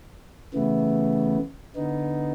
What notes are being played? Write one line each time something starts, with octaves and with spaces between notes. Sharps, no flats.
C#3 E3 A3 B3
D3 B3 D#4